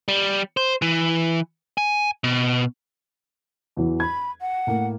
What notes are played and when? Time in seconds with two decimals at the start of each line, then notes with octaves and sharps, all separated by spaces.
0.08 G3
0.57 C5
0.82 E3
1.78 G#5
2.24 B2
3.77 E2 E3 F#3
4.00 B5 G#6
4.41 F#5
4.67 A2 A#3